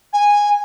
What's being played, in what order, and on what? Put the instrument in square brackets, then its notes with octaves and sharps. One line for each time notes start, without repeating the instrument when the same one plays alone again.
[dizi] G#5